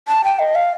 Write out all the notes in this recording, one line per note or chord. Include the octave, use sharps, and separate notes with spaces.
A5
G5
D#5
F5